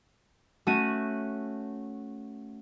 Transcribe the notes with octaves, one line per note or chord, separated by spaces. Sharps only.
A3 C#4 F#4 D#7